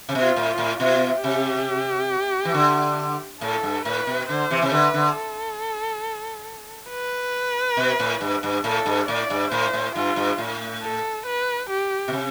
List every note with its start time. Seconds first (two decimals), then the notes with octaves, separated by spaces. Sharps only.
0.09 C3
0.15 B2
0.22 F4
0.36 A2
0.51 F4
0.58 A2
0.80 B2 F4
1.23 C3 G4
2.45 E3
2.54 D3
3.41 A2 A4
3.63 G2
3.85 A2 B4
4.07 B2
4.29 D3 C5
4.50 C3 E3
4.62 C3
4.72 D3 B4
4.94 D3
5.15 A4
6.90 B4
7.77 B2
8.00 A2
8.21 G2
8.43 G2
8.64 A2 A4
8.86 G2
9.08 A2 D5
9.30 G2
9.51 A2 C5
9.73 A2
9.95 G2 F4
10.16 G2
10.38 A2
10.82 A4
11.26 B4
11.69 G4
12.08 B2
12.13 C3